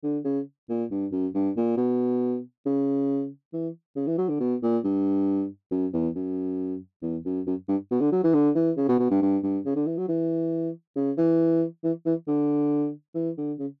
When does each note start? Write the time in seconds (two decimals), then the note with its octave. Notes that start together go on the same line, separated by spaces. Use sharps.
0.03 D3
0.24 C#3
0.69 A#2
0.91 G2
1.12 F#2
1.34 G2
1.57 A#2
1.77 B2
2.66 C#3
3.53 E3
3.96 C#3
4.07 E3
4.18 F#3
4.29 D3
4.40 B2
4.63 A#2
4.84 G2
5.71 F#2
5.93 E2
6.15 F#2
7.02 E2
7.25 F#2
7.47 F#2
7.68 G2
7.91 B2
8.01 D3
8.12 F#3
8.24 E3
8.34 D3
8.55 E3
8.77 C#3
8.89 B2
8.99 B2
9.11 G2
9.22 G2
9.43 G2
9.66 C#3
9.76 D3
9.87 E3
9.97 F#3
10.08 E3
10.96 C#3
11.18 E3
11.84 E3
12.06 E3
12.28 D3
13.14 E3
13.37 D3
13.59 C#3